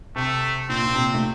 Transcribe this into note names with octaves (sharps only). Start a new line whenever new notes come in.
C3 A3
A#2 C4
A#2
C3
A3